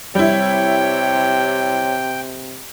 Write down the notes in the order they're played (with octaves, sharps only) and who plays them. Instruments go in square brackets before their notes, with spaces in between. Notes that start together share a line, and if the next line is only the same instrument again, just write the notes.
[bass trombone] C3 [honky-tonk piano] G3 E4 [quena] C#5 [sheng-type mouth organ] G5